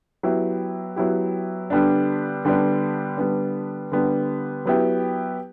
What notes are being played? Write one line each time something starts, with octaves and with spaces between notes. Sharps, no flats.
F#3 B3 E4 G4
F#3 B3 E4 G4
D3 G3 B3 D4
D3 G3 B3 D4
D3 G3 B3 D4
D3 G3 B3 D4
F#3 B3 E4 G4